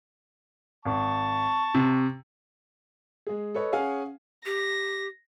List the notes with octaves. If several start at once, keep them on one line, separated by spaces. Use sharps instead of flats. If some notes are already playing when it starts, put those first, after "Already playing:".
G#1 A5 C#6
C3
G#3 G#4
A4 B4 C#5 D#5
C#4 G#4 F5 F#5 G#5
G4 A#6